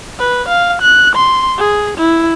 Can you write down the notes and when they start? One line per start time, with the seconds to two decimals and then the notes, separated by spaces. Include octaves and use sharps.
0.19 B4
0.49 F5
0.82 F#6
1.15 C6
1.58 G#4
1.98 E4